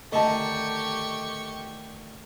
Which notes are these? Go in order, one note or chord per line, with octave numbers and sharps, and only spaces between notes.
D3 D#3 A3 G4 D#5 A5 C#6